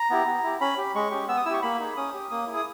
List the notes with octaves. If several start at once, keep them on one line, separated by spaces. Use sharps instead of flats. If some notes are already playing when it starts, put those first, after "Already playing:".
Already playing: A#5
B3 E4 G4
B3
E4 G4
C#4 B5
G4
G#3 C#6
C#4 G4
B3 E6
D#6
E4 G4 C#6 E6
A#3 B5
D#4 G#4
C#4 D#6
G4
A#3 D#6
E4 G#4
D#6